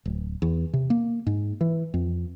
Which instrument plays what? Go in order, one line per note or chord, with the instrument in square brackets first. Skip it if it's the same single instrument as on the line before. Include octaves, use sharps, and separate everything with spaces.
[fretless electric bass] D1
E2
C3
A#3
G#2
E3
F2